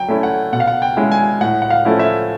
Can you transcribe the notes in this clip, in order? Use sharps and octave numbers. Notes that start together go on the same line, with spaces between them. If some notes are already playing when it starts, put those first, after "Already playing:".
Already playing: F#3 G5
A3 C#4 E4
F#5
B2 F#5
F5
F#5
G5
G#3 C#4 E4
G#5
A2 F#5
F#5
F5
F3 A3 C#4 E4
E5